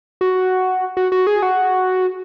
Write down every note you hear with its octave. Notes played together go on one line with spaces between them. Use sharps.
F#4
F#4
F#4
G#4
F#4